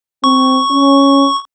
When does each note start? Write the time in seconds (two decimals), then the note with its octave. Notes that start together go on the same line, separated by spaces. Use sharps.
0.24 C4 C#6
0.71 C#4